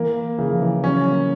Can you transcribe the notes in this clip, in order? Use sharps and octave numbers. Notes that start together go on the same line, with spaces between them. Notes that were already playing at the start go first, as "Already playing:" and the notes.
Already playing: E3 A#3
C#3 E3
F3
E3
F#3 C#4
A#3